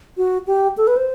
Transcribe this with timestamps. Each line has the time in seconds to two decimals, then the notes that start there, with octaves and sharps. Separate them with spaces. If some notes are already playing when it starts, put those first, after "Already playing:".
0.17 F#4
0.47 G4
0.77 A4
0.87 B4
0.97 C5